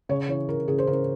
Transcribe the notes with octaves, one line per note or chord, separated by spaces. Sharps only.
C#3 C#5
E3 C#5
C#3 A#4
C#3 G#4
C5
C#3 A#4